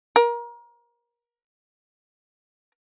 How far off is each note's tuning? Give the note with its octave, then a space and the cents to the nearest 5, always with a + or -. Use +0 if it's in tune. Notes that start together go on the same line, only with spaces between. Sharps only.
A#4 +30